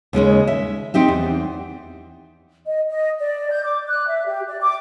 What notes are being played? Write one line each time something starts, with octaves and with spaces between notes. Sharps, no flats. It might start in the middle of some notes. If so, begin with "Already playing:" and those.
D#2 C#3 G#3 C#4
E5
C4 D#4 G4 E5
E2
D#5
D#5
D5
G6
D6
F#6
E5
G4
D5
D6